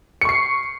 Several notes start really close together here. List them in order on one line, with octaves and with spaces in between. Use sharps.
C#7 C#6 C7